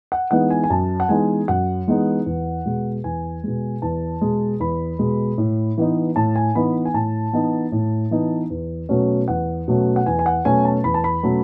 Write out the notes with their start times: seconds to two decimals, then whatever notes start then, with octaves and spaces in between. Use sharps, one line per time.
0.12 F#5
0.31 E3 G#3 B3 D#4 F#5
0.50 G#5
0.64 G#5
0.70 F#2 A5
1.00 F#5
1.09 E3 G#3 B3 D#4 G#5
1.48 F#2 F#5
1.87 E3 G#3 B3 D#4
2.26 E2
2.66 B2 G#3
3.04 E2 G#5
3.43 B2 G#3
3.82 E2 A5
4.21 B2 G#3
4.60 E2 B5
4.99 B2 G#3
5.38 A2
5.78 E3 B3 D#4
6.16 A2 A5
6.36 G#5
6.55 E3 B3 D#4 B5
6.85 G#5
6.94 A2 A5
7.33 E3 B3 D#4
7.72 A2
8.11 E3 B3 D#4
8.50 E2
8.89 B2 F#3 A3 C#4
9.28 E2 F#5
9.68 B2 F#3 A3 C#4
9.96 F#5
10.06 E2 G#5
10.19 G#5
10.26 F#5
10.45 B2 F#3 A3 C#4 G#5
10.65 A5
10.84 E2 B5
10.94 A5
11.04 B5
11.23 B2 F#3 A3 C#4